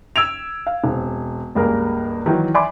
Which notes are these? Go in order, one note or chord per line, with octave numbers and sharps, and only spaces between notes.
E6 G#6 D7 F7
F5
E1 C4
C#2 G2 A#3 G#4 A#4
D#3 E3 F#3 D#4
D5 E5 G#5 B5 C6 D6